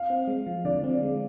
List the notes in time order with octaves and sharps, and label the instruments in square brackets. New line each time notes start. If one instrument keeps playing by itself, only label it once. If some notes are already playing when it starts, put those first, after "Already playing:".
Already playing: [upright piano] F5
[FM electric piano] C4
G#3
F3
[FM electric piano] D3 [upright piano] D5
[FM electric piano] C4
G#3